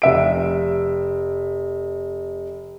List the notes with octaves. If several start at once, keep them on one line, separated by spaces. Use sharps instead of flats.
F1 E5 D7